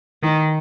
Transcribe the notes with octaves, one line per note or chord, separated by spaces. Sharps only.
D#3